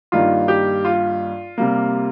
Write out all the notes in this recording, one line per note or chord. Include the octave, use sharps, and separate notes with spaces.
G2 D#3 A#3 F4
G4
F4
C3 G3 A#3